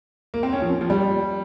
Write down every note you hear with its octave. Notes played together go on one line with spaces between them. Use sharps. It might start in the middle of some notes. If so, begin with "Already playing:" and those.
A#3
C4
C#4
F3
F3
G3